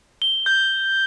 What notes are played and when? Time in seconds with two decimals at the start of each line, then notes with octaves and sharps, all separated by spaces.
0.22 G7
0.46 G6